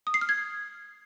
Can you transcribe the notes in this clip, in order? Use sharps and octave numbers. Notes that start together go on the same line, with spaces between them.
D#6
C7
F6
G#6